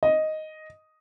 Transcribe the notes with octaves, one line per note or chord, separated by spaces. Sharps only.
D#5